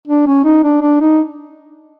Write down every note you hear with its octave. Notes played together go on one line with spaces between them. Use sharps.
D4
C#4
D#4
D4
D4
D#4